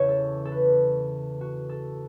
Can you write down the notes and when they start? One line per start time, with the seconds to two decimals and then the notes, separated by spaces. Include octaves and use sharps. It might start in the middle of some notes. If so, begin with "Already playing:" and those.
Already playing: E2 C#3 E3 C#5 E5
0.09 A4
0.45 A4
0.52 B4
1.41 F#4
1.69 A4